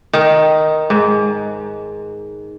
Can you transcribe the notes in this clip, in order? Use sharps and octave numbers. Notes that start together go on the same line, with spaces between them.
D#3
G#2